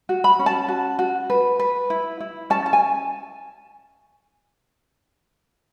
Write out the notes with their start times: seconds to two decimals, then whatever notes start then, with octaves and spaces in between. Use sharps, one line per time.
0.09 F#4
0.24 B5
0.39 C#4
0.46 A5
0.68 F#4
0.99 F#4
1.30 B4
1.59 B4
1.90 E4
2.21 E4
2.50 C#4 A5
2.66 A5
2.73 G#5